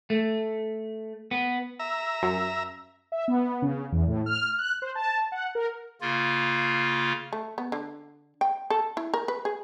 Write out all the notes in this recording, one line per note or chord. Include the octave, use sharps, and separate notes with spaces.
A3
B3
E5 A#5
F#2
E5
B3
C#3
E2
A2
F6
F#6
C5
A5
F#5
A#4
C#3 A#3 F4
A3
B3
D3
G5
A4
E4
A#4
B4
G#4